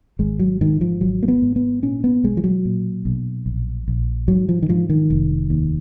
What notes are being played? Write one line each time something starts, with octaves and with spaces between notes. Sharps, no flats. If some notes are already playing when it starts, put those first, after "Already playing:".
G#1 G#3
F#3
G#2 D#3
F3
G#1 F#3
A#3
B3
G#2
B3
A#2 C#4
B3
B1 G#3
F3
F#3
A#2
B1
A#1
A#1
G#2 F#3
F3
D#3
G#2 F3
D#3
F1
D#2